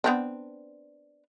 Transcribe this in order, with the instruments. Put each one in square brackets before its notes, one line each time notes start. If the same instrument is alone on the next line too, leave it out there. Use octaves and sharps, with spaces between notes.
[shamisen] B3 C4 D4